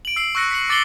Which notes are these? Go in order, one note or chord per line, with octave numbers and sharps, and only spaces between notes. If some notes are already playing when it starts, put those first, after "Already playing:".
D7 F#7
E6 C7 F#7
C#6 E6 F#6 A#6 C#7
B6 C#7 F#7
D6 A6 C7 C#7 F#7 G7